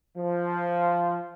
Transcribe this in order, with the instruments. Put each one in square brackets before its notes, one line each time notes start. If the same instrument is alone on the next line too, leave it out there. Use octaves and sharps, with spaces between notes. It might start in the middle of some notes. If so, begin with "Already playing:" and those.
[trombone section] F3